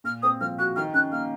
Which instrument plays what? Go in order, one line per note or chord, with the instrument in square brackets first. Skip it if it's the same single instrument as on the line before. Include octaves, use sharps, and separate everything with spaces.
[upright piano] A#2 [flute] F6
[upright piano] C4 [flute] D#6
[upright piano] F3 [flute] F6
[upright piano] F#4 [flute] F#6
[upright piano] D#3 [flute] F6
[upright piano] C#4 [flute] F#6
[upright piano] A#3 [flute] F6